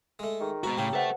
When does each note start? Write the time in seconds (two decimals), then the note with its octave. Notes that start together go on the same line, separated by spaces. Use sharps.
0.19 G#3 A3
0.41 D#3 G#4
0.63 G#2 B3 F#4 A#5 B5
0.78 A2 C#3 C#4 G4
0.93 A4 B4 C5 E5 F#5